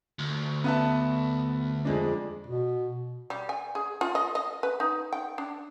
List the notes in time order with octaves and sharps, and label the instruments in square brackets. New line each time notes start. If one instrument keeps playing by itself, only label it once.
[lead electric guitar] D2
[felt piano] B3 E5 A5
F2 G#3 D4
[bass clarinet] B2
[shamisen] G3
G#5
G#4
F4
D#5
D#5
B4
D#4
G5
D4